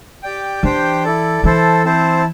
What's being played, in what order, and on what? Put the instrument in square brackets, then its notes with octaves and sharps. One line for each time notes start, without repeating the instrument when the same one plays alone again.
[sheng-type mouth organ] G4 D5 G5
[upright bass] E3 [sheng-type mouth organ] D4 G4 C5 G5
[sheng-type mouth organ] E4 A4 D5
[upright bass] E3 [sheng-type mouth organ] E4 A4 C5 A5
[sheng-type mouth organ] C4 E4 C5 A5